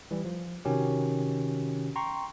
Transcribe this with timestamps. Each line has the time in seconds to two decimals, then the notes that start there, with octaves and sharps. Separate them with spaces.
0.11 E3 G3
0.25 F3
0.65 C3 D#3 C#4 F#4 G4
1.96 G5 A#5 C6 C#6